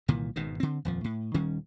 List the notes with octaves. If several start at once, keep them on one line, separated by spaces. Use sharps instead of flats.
C2 A#2 D#3 E3
G#1 G#2 B2 D#3
D3 C4
D#1 F2 F3
A2
D#1 D#3 G3 C#4